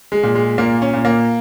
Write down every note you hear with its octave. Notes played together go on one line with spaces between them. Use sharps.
G#3
A#2
G#3
A#2 A#3
C#4
A#2
A#3